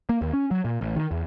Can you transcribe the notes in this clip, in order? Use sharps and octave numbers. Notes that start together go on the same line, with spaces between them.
A#3
D#2
C#4
F#3
A#2
A1
D#3
E2